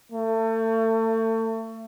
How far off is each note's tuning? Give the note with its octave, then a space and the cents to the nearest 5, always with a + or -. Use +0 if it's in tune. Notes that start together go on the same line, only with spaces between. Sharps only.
A3 +35